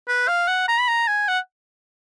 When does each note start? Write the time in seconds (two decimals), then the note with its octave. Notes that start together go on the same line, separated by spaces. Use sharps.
0.08 B4
0.28 F5
0.48 F#5
0.68 A#5
0.80 B5
0.88 A#5
1.08 G#5
1.28 F#5